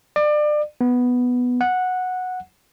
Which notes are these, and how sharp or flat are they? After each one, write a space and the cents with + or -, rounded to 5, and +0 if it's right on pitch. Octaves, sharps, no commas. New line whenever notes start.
D5 +30
B3 +0
F#5 -10